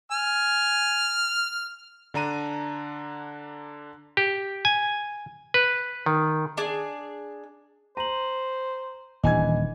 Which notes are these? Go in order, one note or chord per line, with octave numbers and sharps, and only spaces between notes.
G#5 F6
D3 D4 A#5 D#7
G4
G#5
B4
D#3
D4 G#4
C5 A#5 D#7 F#7
D#1 E3 D4 D#5 G#5 G#6